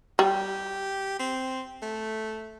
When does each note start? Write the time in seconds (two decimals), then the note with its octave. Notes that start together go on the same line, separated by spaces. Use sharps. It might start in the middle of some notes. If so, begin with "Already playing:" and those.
0.19 G3 G4
1.19 C4
1.82 A3